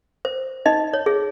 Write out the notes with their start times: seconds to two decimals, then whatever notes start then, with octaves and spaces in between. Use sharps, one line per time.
0.25 C5
0.66 D#4 D#5
0.93 C#5
1.06 G#4